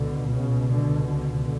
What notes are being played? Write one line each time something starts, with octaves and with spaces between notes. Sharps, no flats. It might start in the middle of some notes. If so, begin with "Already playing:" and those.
Already playing: C#2 B2 D3
C#3
D3
D3